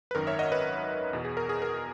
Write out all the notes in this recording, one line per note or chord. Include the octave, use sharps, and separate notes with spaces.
B4
G#1 F#2 D#3 A#4
C#5 E5
D#5 F#5
B4 D#5
E2 B2
G#4
A#4
G#4
A#4